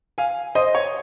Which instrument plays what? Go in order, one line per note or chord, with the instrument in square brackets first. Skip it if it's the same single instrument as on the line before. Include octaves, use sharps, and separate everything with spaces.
[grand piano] F5 G#5
C5 D#5
C#5